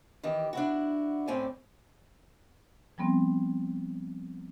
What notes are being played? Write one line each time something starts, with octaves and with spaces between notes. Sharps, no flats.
D#3 E3 G4
D4 E4 F#4
A2 C4 C#4 D5 G#5
F3 G3 B3 C4